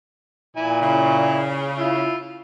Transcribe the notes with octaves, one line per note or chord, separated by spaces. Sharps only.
A#2 E4 G#5
C#3 E4
E4 F4